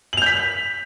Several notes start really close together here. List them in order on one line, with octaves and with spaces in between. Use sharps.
F#7 F7 G6 B6